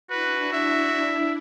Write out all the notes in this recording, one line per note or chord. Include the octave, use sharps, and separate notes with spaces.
D4 E4 F#4 B4
E5